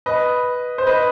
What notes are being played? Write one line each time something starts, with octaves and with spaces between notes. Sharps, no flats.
B4 D#5
C5
B4 D#5